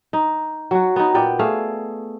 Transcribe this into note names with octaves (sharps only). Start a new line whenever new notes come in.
D#4
F#3 F#4
B3 D#4
A#2 B3 D5 G5
A3 G#4 F5